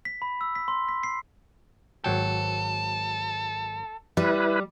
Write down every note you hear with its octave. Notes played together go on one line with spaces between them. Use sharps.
B6
B5
E6
B6
C6
B6
C7
G#1 F#3 A4 G5
G3 E4 B4